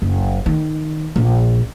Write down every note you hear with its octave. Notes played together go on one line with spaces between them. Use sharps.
F#1
D#3
A#1